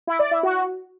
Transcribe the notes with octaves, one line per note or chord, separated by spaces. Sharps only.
E4
D5
E4
F#4